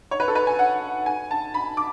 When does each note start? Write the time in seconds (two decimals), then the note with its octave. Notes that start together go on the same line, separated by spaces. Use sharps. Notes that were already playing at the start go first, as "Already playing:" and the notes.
0.11 C#5
0.20 B4
0.28 A4
0.35 B4
0.47 G#5
0.59 F#5
1.06 G#5
1.31 A5
1.54 B5
1.77 D6